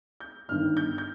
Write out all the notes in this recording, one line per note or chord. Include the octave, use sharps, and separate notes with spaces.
G6
G1 G2 D#3 F6
G6
G6